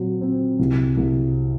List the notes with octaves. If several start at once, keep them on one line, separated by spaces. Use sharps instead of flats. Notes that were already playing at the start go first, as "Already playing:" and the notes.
Already playing: A#2 F#3 C4
C4
C2
C2